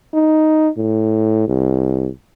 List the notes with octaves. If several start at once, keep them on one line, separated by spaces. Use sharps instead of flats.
D#4
A2
C2